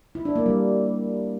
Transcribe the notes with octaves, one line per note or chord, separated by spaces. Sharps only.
E4
D4
A#3
G3